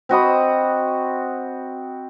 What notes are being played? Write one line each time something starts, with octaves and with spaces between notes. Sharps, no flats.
C4 F#4 D#5 B5